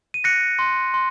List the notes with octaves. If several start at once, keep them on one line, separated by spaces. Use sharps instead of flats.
D#7
F#6 A#6 C#7
C6
C6